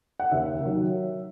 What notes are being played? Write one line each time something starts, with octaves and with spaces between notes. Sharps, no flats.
F#5
D#2 E5
D#3 F#3